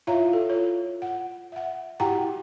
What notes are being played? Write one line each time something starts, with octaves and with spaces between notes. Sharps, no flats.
E4 F4 C#5 E5 F5 A#5
A4
F4 C#5
F#5
E5 F#5
E4 F#4 G4 F#5 G5 A#5